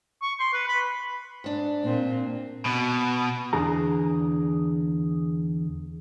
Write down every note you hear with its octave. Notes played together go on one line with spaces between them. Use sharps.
C#6
C6
B4
B5
G#2 D4
A#2 C4
B2
E2 D3 G#4 A#5